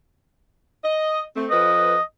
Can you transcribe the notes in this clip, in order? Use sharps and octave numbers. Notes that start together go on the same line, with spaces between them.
D#5
A3 C4
F2 F3 B4 D#5